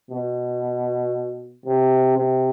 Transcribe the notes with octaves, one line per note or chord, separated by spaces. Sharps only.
B2
C3
C3